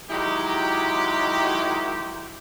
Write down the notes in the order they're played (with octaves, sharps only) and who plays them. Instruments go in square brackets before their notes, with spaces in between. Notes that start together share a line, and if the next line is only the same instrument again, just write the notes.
[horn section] D#3 F#3 G#3 E4 G4